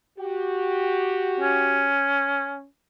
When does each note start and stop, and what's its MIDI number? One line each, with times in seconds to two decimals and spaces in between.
0.19 1.92 66
0.19 1.92 67
1.40 2.66 61